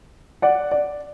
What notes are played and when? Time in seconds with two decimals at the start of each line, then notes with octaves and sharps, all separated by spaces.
0.42 D5 F#5
0.72 D5